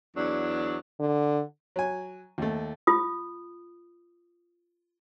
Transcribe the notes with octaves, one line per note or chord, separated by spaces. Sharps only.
E2 F#3 D4
D3
F#3 G#5
D#2 A3
F4 D#6